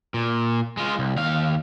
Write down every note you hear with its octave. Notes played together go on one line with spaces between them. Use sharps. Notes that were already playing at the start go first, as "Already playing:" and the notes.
A#2
G#3 F4
C2
D#2 F5